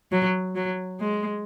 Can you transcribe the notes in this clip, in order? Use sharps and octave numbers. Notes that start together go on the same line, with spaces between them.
F#3
F#3
G#3